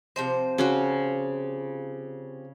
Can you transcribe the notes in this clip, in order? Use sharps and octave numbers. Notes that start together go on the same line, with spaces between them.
C3 F3 C5
C#3 C#4 F#4